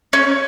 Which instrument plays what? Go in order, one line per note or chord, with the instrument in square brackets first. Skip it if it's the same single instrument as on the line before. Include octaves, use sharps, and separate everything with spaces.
[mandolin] C#4